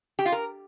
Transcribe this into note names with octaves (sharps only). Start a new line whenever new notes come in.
G4
F4
A#4